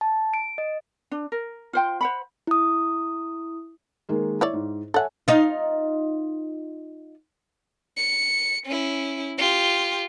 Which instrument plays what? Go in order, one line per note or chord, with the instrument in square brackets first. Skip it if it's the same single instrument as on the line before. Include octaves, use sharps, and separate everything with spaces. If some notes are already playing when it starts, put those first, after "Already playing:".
[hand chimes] A5
D7
D#5
[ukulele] D4
A#4
F4 C5 G5
C5 F#5 B5
[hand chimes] E4 D#6
[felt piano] D#3 G#3 A#3
[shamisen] E4 C#5 D5
[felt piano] G#2
[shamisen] A4 F#5 [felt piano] C#5 E5 G#5
[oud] D#4 F4
[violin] C#7
C#4 E4
F4 G4